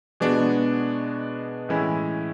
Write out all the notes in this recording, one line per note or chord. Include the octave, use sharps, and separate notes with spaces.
B2 G#3 B3 D4 F#4
A2 E3 G#3 C#4 E4